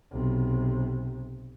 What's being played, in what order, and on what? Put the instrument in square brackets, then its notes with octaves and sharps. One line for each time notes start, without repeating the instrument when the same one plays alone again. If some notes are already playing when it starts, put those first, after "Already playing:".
[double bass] B1 C3